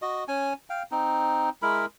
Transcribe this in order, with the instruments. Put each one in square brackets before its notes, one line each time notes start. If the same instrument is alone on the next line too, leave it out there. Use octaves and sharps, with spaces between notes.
[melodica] F#4 D#5
C#4 G#5
F5 G5
C4 D#4
G#3 E4 A#4 B5